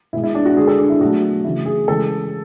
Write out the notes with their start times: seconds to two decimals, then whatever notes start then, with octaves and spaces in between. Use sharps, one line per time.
0.13 B2 G#3 E4
0.24 E4
0.35 D4
0.45 F#4
0.56 D3 G#3 G#4
0.67 A4
0.78 D4
0.90 E4
1.00 B2 F#3 A3 F#4
1.44 C#3 E3 A3 E4
1.66 G#4
1.88 C#3 E3 G#3 A4